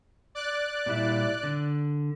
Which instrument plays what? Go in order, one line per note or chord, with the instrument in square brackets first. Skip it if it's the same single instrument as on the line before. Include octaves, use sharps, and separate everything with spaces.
[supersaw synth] D5 F#6
[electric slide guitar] A#2 G3 E4
D3